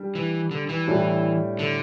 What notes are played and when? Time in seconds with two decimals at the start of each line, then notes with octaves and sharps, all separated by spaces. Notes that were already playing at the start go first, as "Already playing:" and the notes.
Already playing: G3 D4 G4
0.15 E3
0.51 D3
0.69 E3
0.87 A2 G3 D4
1.59 D3